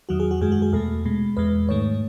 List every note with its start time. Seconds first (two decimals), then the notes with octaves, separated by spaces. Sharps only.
0.09 E2 D#3 F#3 F#4
0.20 G#4
0.31 F#4
0.41 F#2 D#3 G#3 G#4
0.52 F#4
0.62 G#4
0.73 E2 B2 A3 A4
1.05 B2 G#3
1.37 E2 B2 G#3 B4
1.69 G#2 D#3 A3 C#5